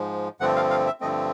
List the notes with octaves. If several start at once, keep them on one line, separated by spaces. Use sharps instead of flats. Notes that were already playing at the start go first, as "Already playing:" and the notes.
Already playing: G#2 F3 G#3
G2 D3 F3 A3 C4 F#5
F5
F5
E5
G2 D3 F3 A3 C4 D#5